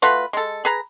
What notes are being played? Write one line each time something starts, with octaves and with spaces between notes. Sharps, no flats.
A3 F4 F#4 B4
G#3 A4
G#4 B4 A#5